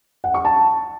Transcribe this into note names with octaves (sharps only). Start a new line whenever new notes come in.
F#5
C#6
A5